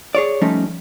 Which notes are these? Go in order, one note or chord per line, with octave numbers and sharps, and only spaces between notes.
G#4 C#5 D5
F3 G3 A3 C#4 D#4